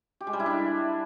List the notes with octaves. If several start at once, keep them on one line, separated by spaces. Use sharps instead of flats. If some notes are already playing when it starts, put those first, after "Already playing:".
G4
G#3
G3
E4
D4